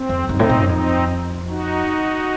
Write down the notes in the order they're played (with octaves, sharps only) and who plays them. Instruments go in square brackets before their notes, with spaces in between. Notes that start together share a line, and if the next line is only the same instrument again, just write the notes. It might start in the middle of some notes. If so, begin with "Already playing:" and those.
Already playing: [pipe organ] C4
[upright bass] F2
[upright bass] F#2 [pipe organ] C4 D#4
[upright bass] A2
A2
F#2
[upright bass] F2 [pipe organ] C4 D#4
[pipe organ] D#4 F#4